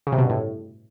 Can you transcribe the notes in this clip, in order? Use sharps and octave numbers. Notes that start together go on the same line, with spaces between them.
C#3
C3
B2
G2
A2